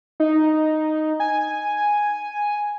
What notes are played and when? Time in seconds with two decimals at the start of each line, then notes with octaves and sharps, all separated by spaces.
0.20 D#4
1.20 G#5